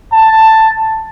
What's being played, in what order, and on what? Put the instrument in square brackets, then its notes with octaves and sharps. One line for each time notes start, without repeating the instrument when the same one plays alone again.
[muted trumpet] A5